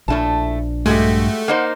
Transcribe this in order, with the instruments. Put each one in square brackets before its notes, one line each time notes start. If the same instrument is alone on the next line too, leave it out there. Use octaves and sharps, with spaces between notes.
[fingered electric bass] A#1 D4 [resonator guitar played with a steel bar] A2 A3 A5
[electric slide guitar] G2 [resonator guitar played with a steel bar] G#3 F#4 G4 [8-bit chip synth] A3
[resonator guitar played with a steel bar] A#3 D#4 C5 [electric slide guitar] F#5